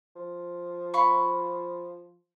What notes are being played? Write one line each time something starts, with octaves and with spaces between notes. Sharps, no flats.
F3
F5 B5 C#6